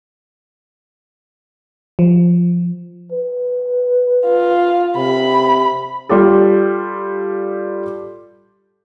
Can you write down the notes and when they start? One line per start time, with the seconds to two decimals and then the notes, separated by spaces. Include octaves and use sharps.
1.99 F3
3.12 B4
4.26 F4
4.97 C3 B5
6.09 G3 F4 G4 A4